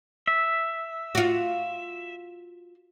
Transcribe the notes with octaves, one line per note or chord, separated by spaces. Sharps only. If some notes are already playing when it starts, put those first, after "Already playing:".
E5
F4 F#4